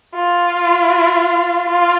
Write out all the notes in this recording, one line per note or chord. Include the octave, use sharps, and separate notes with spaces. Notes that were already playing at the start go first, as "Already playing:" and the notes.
F4
F4